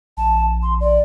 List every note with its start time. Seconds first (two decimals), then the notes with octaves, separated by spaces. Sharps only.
0.17 A#1 A5
0.62 C6
0.80 D5